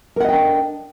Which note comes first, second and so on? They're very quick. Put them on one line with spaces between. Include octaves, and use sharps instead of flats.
A#4 F#5 D#5 G5 D4